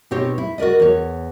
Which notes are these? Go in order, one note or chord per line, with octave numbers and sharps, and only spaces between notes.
B2 C4 D#4 G4 C#5
E4
F#4 A#4 D5 D#5
E2 C#5